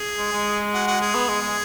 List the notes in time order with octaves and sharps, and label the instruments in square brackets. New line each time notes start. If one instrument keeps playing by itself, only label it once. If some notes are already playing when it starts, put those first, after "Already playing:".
Already playing: [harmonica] G#4
[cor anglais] G#3
G#3
[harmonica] F#4
F#4
G#4
[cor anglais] B3
G#3
G#3